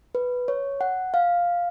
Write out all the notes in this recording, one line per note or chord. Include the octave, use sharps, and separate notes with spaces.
B4
C#5
F#5
F5